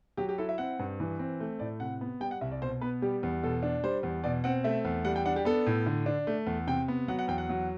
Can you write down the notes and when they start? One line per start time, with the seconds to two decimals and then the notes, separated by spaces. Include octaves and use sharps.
0.17 F#3 G4
0.29 G4
0.38 E4 A4
0.49 E5
0.58 C4 F#5
0.79 G2
1.00 E3
1.19 C4
1.40 A3
1.60 A2 D5
1.80 C3 F#5
2.01 B3
2.20 G3 G5
2.31 F#5
2.41 C2 E5
2.52 D5
2.62 B2 C5
2.81 B3 B4
3.02 G3 G4
3.23 E2
3.43 B2 A4
3.63 D4
3.84 G3 C5
4.03 E2
4.24 B2 D5
4.44 C4 F#5
4.64 A3 E5
4.85 E2
5.05 G3 F#5
5.16 G5
5.25 D4 F#5
5.36 G4
5.45 B3 A4
5.66 A2
5.86 D3
6.06 D4
6.27 A3
6.47 E2
6.67 C3 G5
6.88 B3
7.08 F#3 F#5
7.19 F#5
7.28 E2 G5
7.38 F#5
7.49 F#3